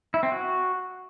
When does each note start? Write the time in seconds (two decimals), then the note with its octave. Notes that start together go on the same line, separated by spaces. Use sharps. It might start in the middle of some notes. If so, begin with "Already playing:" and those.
0.14 E4
0.23 C4
0.32 F#4